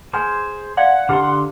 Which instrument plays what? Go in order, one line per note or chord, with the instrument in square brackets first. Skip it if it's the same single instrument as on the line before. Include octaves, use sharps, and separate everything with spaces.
[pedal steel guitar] G#4 C5 [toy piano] B4 G#5
[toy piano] D5 F5 C6 [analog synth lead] F#5
[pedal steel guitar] D3 C6 [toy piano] E4 G4 B4